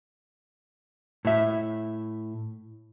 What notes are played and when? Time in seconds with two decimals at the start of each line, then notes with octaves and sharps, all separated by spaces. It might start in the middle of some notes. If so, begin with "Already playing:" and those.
1.25 A2 E5